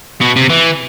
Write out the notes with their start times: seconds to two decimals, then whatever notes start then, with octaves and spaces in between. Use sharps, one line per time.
0.21 B2
0.36 C3
0.50 E3